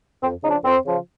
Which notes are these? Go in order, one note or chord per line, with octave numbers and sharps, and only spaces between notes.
F2 C4
C#3 F3 D4 D#4
F2 C4
C#3 F3